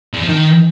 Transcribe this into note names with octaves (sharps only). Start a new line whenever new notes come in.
E2
F3
D#3